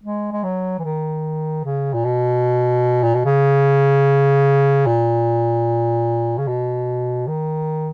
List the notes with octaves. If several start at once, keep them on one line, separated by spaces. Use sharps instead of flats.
G#3
G#3
F#3
E3
D#3
C#3
A#2
B2
A#2
B2
C#3
A#2
C#3
B2
D#3